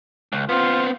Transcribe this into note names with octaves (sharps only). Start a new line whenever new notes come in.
C#2
B3 C4 F4